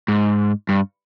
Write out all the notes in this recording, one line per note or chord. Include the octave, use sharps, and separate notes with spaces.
G#2
G2